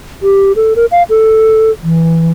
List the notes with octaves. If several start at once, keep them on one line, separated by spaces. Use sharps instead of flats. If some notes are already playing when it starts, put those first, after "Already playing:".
G4
A4
A#4
F5
A4
E3